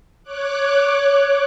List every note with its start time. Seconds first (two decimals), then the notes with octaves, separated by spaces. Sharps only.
0.23 C#5 D6 F#6